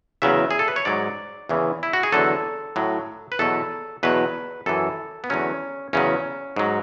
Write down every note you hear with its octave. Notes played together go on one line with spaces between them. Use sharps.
E2 C#3 F#3 E5
G#4
A4
B4
C#5
G#2 F#3 D5
E2 C#3 E3
E4
F#4
G#4
E2 D3 F#3 A4
A2 F#3
B4
E2 B2 F#3 A4
E2 B2 F#3 B4
F#2 E3 A4
B3
E2 D3 F#3 C#4
E2 C#3 F#3 C#4
G#2 F#3